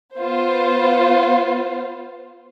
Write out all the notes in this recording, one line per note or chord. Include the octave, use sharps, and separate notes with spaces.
B3 F4 C5